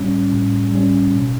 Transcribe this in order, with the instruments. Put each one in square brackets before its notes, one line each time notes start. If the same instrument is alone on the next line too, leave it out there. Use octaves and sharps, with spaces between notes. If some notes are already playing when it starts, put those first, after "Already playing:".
Already playing: [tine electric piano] A2 G3 C#4
A2
G3 C#4
B2